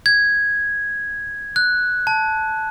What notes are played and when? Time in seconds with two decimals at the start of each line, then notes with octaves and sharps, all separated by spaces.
0.06 G#6
1.56 F#6
2.07 A5